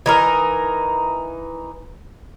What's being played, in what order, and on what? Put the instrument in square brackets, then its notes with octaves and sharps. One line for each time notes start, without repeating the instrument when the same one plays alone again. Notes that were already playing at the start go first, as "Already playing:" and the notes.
[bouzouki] E3 D#4 A#4